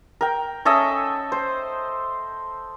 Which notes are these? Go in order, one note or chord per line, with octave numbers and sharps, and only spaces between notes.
A#4 G5
C#4 A4 D#5 E5
C5